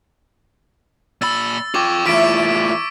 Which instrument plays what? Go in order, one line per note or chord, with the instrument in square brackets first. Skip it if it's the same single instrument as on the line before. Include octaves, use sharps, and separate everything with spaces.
[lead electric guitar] A#2 B5 [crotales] E6 A6
[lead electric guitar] F4 G5 [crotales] C#6 D6 G#6
[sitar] E2 E4 [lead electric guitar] A2 F4 [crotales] E6 B6 D7